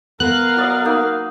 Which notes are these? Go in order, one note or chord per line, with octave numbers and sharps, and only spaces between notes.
B3 A#4 F5 F#6
F#3 D5 D#5
A#3 D#4